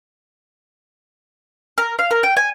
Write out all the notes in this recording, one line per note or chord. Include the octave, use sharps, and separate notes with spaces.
A#4
F5
A#4
G5
G#5